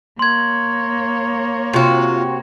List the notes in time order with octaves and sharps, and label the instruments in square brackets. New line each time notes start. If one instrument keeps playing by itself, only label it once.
[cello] A#3 C#5 [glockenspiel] C6 G#6
[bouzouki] C3 F#4 [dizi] F4